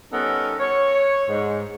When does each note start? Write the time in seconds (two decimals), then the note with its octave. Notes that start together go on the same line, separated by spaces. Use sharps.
0.12 G3 B3 C#4 D#4 A4 A#4
0.60 C#5
1.29 G#2